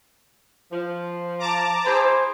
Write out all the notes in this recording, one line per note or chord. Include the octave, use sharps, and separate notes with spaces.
F3
A5 A#5 D6
E4 G#4 C5